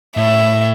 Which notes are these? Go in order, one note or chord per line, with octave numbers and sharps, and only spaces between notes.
A2 E5